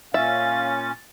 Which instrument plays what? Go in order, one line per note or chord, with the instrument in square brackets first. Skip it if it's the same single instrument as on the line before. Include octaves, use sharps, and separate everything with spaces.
[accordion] A#2 C#4 [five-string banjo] E5 [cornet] F5 [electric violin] A6